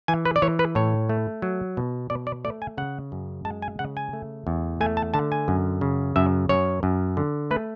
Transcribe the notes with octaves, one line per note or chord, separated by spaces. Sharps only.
E3 G#5
B4
D5
E3 C#5
B4
A2 C#5
A3
F#3
B2
B2 D5
D5
A3 D5
G#5
C#3 F#5
F#2
G#3 A5
G#5
C#3 F#5
G#5
A3
E2
A3 G#5
A5
D3 A5
G#5
F#2
C#3
F#2 E5
F#2 C#5
F#2
D3
A3 B4